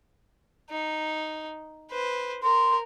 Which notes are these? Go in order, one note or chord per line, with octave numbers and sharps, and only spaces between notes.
D#4
B4 C5
A#4 C6